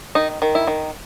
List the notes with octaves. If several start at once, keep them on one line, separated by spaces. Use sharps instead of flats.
D#3 D#4
D#3
E4
D#3